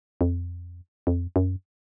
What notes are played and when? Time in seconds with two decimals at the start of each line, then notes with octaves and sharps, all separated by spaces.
0.21 F2
1.07 F2
1.36 F#2